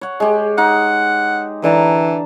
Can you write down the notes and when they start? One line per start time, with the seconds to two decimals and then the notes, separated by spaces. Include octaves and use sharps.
0.01 C#5 F#5
0.20 G#3 G4
0.58 D#4 F#5
1.64 D3 E3 A5 A#5